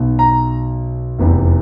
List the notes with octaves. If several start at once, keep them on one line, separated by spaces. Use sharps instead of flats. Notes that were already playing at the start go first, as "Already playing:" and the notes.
Already playing: B1 B2
A#5
F1 E2 C3 E3